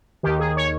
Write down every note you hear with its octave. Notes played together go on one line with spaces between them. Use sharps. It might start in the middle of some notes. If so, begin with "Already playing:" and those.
D#2 D#3 G4
G#4
C#5